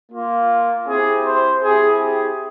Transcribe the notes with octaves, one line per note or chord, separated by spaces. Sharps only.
A#3 F4
C4 E4 G4 G#4
C5
C4 E4 G4 G#4
G#4